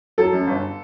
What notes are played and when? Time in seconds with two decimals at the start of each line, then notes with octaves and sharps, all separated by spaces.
0.18 F#3 A4
0.33 F#2
0.47 G1